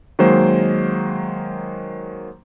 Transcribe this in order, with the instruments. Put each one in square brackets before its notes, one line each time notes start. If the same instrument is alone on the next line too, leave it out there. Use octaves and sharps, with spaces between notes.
[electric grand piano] D#3 F#3 G#3 A#3 C5